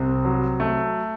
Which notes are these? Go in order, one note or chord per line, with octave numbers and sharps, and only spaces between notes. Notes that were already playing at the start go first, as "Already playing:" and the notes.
Already playing: C2 C3
F#3
A3